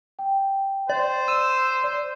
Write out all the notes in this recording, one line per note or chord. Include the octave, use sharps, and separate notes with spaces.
G5
C5 D5
E6 D#7 E7
D5